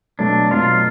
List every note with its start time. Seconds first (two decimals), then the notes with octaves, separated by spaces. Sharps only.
0.19 B2 F#3 A3 D4
0.51 B2 F#3 A3 F4